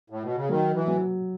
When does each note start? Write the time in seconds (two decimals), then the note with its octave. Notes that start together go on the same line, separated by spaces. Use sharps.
0.10 A2
0.23 B2
0.36 C#3
0.49 D#3 F#3
0.74 E3
0.88 F#3